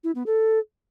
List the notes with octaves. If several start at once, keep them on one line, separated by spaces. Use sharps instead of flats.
E4
B3
A4